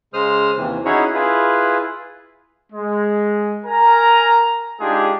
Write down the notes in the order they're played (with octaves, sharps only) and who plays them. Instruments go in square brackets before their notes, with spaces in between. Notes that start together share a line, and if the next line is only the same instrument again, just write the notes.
[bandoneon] C#3 G#3 C5 D#6 F6
D#2 C3 E3
C#4 D#4 E4 F#4 G#4 C#5
E4 F4 G#4 B4
[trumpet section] G#3
A#4 G#5 A#5
G#3 D4 D#4 F4 G4 G#4